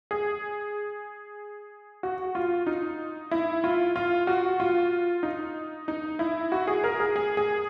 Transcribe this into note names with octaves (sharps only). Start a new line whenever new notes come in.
G#4
F#4
F4
D#4
E4
F4
F4
F#4
F4
D#4
D#4
E4
F#4
G#4
A#4
G#4
G#4
G#4